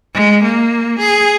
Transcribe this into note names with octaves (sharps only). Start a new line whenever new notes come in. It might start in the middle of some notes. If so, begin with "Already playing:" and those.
G#3
A#3
G#4